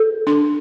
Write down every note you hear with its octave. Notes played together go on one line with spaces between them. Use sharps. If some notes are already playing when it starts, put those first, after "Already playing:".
Already playing: A4
D4